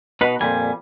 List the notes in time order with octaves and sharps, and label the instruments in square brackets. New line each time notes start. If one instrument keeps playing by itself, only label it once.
[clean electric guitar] B2 [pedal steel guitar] D#4 B4
[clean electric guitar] F2 A#2 G3 [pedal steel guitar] G#5